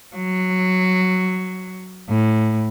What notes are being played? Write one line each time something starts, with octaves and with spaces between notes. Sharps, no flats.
F#3
A2